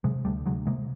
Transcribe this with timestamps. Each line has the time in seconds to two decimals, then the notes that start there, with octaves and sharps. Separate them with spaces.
0.04 C3 F#3 G#3
0.25 D2 G3 A3
0.46 D2 F#3 G#3
0.67 C3 G#3 A#3